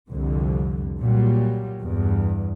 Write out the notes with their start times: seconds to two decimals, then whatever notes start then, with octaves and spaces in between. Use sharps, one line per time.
0.10 C2 F2 D3
0.99 A#2 F#3 G3
1.82 E2 G2